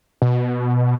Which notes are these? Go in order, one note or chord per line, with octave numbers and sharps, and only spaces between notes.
B2